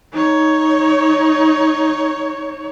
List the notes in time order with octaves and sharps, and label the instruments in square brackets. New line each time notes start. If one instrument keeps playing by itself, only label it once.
[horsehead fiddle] D#4 C#5